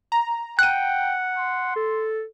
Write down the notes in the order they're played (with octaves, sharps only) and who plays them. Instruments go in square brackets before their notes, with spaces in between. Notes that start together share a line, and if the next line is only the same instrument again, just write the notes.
[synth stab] A#5
[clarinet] F#5 [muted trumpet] G5 [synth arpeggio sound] F#6 D#7
[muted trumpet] C6
[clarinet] A4